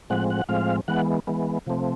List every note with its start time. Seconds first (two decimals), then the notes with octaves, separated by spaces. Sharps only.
0.10 A2 F3 G#3 C4 F#5
0.30 F#5
0.49 A2 F3 G#3 C4 F5
0.88 E3 G#3 B3 F#5
1.27 E3 G#3 B3
1.67 C3 F3 A3 C4